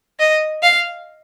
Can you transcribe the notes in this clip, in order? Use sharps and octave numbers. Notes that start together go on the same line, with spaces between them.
D#5
F5